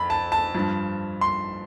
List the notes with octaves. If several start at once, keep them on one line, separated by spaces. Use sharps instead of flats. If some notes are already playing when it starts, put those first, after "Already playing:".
Already playing: F2 B5
A5
A5
G2 F3
C6